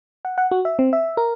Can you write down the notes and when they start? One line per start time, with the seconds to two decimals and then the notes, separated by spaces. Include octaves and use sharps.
0.25 F#5
0.38 F#5
0.51 F#4
0.65 E5
0.79 C4
0.93 E5
1.17 A#4